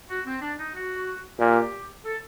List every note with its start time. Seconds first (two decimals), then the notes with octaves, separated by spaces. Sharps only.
0.09 F#4
0.25 C4
0.41 D4
0.58 D#4
0.74 F#4
1.39 A#2 G4
2.05 A4